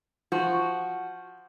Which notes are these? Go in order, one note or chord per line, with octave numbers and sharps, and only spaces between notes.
F3 F#4